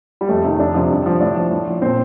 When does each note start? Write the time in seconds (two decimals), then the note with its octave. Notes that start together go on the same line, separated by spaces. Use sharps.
0.21 G3
0.29 F2 A3
0.45 C3 D#3
0.59 F2 D4
0.74 C3 F3
0.90 G2
1.05 D3 F3
1.20 A2 D4
1.36 F3
1.51 A2
1.67 F3
1.82 A#2 C4